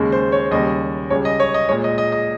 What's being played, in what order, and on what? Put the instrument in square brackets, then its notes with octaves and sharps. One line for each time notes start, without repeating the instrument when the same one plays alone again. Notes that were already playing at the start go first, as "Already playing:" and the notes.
Already playing: [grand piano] D#2 C#3 G#3
C5
C#5
D#2 C#3 G3 D#5
C#2 C#3 G3 C#5
D#5
C#5
D#5
A#2 G#3 C#5
D#5
D#5
D#5